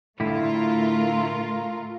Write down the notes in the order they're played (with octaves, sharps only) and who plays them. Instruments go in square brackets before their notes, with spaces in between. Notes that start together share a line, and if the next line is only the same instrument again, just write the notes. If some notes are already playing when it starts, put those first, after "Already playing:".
[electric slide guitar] A2 D3 E4 [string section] A3 F4 A#4